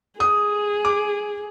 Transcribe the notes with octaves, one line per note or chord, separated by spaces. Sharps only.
G#4 D#6
D6